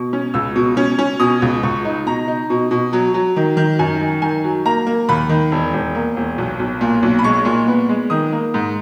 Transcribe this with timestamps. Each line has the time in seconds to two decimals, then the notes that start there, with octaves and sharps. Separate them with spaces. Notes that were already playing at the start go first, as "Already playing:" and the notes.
Already playing: B2
0.13 C#4
0.34 C#2 E6
0.56 B2
0.77 C#4
0.99 C#4
1.20 B2 D#6
1.42 C#2
1.63 C#2 C#6
1.85 D#4
2.06 B2 A#5
2.28 D#4
2.50 B2
2.71 B2
2.93 F#3
3.14 F#3
3.36 D#3
3.57 D#3
3.79 F#2 G#5
4.01 D#3
4.22 D#3 G#5
4.44 F#3
4.65 A#3 A#5
4.87 A#3
5.09 D#2 B5
5.29 D#3
5.52 E1
5.73 E1
5.95 A#3
6.17 E1
6.38 B1
6.59 B1
6.81 A#2
7.02 B1
7.19 B5
7.24 G#3 C#6
7.45 A#2
7.68 B3
7.89 G#3
8.10 D#3 D#6
8.32 A#3
8.54 G#2